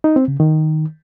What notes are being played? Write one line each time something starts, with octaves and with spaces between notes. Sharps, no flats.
D#4
C4
C#3
D#3